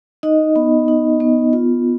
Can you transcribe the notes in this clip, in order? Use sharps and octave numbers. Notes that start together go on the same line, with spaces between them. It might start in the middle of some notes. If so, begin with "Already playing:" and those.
D#4 D#5
B3
D#4
B3
F4